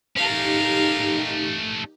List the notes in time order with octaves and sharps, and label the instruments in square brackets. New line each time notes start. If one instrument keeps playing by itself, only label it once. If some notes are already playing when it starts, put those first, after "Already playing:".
[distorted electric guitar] A3 C#4 [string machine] D#4 G4 [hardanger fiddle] A#4 F5